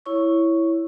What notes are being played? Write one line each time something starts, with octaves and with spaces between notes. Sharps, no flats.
E4 C#5 C#6